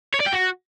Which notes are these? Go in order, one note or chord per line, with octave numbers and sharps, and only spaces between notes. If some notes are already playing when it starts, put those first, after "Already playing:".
C#5
D5
G5
F#4